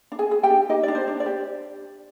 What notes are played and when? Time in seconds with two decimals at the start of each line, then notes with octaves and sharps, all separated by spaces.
0.12 D4
0.19 G#4 G#5
0.31 G#4
0.43 G4 G5
0.50 D4
0.69 D#4 G4 D#5
0.83 D4 D5
0.95 C5
1.07 D4
1.20 D5
1.26 G4